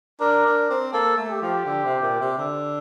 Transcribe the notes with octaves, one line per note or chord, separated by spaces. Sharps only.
D4 A#4
D4
C4
A#3 A4
A3
G4
F3
D3
C3
A#2
C3
D3